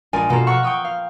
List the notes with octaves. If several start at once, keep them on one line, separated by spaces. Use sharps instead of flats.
A#1 G#3 A#4 D5 G#5
B2 A#3 F4 A4 A#5 E7
F#5 A#5 C#6 E6 F6
G5 C#6 D#6 E6
F5